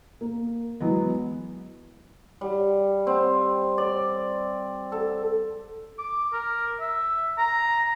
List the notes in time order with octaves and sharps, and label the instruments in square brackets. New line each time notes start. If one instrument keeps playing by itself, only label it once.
[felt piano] A#3
E3 F#3 G#3 B3
[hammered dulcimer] G3
C4
D5
A4
[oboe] D6
A#4
E5
A#5